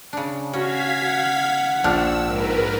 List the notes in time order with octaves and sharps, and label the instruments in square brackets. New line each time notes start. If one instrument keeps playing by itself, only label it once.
[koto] C#3 D4
[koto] C#4 [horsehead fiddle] F#4 [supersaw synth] F5 G#6 B6
[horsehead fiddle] F#5
[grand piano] A#1 F6 [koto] D4 [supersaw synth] E6
[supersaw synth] G#2 A#4 B4